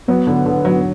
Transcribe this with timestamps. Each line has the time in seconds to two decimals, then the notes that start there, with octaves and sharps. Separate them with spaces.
0.08 F#3 B3
0.27 D3
0.46 D3
0.65 F#3